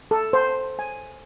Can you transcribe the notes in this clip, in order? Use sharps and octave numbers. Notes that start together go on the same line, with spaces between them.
A4
C5
G#5